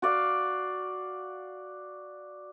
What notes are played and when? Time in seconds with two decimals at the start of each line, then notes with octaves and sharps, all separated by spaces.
0.02 F#4 D5 F5